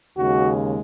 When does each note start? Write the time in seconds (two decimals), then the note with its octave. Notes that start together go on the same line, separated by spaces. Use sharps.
0.17 D#2 C#3 G#3 F#4